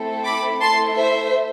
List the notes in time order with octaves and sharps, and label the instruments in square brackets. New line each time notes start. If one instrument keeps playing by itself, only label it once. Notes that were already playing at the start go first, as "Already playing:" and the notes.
Already playing: [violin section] A3 C4 E4 A4
B5 D6
A3 E4 A4 A5 C6
C5 E5